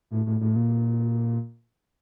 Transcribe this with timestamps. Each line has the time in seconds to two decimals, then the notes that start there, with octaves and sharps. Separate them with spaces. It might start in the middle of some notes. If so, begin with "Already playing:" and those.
0.11 A2
0.26 A2
0.41 A2
0.56 A#2